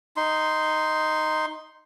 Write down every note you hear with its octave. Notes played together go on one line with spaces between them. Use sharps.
D#4 C6